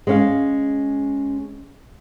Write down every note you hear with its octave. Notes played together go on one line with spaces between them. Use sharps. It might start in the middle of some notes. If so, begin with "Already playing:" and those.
G#3 C#4 F5